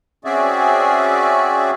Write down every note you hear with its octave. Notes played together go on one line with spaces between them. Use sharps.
C4 C#4 F#4 G#4 D5 E5